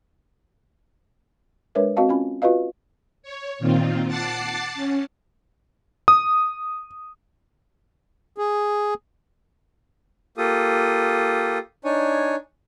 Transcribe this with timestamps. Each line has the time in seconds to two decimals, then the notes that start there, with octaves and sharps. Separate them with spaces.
1.75 G#3 D4 A#4 B4 C#5 E5
1.96 C4 F#4 D#5 F5 A5
2.09 C#4 F4 B5
2.42 F4 F#4 B4 D#5 F5
3.23 C#5
3.59 A#2 D#3 C4 F4
4.06 F#5 A5 D6 A6 C7
4.75 C#4
6.08 D#6
8.38 G#4
10.37 A#3 F4 G4 A4 D#6
11.84 D4 D#4 C#5 G#5